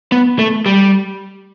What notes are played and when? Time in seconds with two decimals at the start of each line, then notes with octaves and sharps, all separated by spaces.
0.12 B3
0.39 A3
0.66 G3